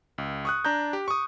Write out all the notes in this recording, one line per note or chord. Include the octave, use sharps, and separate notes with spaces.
C#2
C#6 D#6 F#6
D4 A#5 G6
G4
C#6 D#6